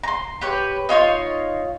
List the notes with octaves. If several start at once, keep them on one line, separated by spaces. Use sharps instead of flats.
A#5 C6
G4 B4 C#5
D#4 F4 C#5 C6